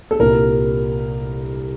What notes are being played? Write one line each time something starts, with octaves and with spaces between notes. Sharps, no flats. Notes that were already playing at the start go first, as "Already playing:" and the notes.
A4
C2 A#2 A#4